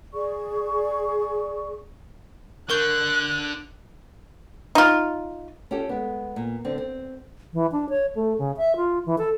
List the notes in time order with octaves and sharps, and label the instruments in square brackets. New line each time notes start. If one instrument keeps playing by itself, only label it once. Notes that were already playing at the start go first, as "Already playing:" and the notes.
[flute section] G#4 D5 C#6
[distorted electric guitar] D3 [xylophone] A#4 C#6 G6 [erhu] F#6
[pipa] D#4 F4
[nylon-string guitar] C#4 F4 G4 A4
G#3 B3
A#2
D3 C4
C4
[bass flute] E3
D4
C#5
A3
C#3
E5
F4
E3
A4